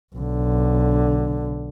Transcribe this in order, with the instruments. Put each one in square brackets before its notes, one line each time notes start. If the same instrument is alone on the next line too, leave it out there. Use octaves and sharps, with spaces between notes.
[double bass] B1 D3